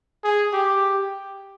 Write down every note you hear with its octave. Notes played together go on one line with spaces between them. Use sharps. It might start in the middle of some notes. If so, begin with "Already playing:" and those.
G#4
G4